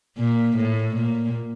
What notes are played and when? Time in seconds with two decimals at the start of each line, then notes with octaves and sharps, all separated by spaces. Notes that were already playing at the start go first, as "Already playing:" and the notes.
0.17 A#2
0.57 A2
0.96 A#2